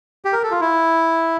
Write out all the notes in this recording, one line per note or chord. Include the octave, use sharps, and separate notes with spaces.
G4
A#4
A4
F4
E4